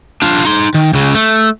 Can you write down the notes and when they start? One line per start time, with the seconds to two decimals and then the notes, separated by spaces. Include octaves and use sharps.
0.22 D4 F4
0.45 D#4 C6
0.74 D#3
0.93 C#2 C#3
1.15 A3